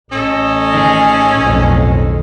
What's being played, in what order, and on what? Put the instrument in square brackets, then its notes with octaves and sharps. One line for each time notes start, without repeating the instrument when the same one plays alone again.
[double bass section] A1 [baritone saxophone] C#4 [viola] A4 D#5
[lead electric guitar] D#3 G#4
[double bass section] B1 F2 A2